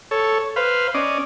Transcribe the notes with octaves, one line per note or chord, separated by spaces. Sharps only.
A4 C#5
B4 C5 F5
C#4 D5 D#5